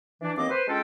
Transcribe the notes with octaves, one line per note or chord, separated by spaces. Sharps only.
E3 D4
D#2 E3 A#3 C4 D#5 D6
B4 C5
G#3 C#4 D4 F4 A4 G5